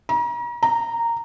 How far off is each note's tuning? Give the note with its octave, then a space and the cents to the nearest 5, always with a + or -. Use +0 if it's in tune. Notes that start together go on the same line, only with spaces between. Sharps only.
A#5 +40
A#5 -10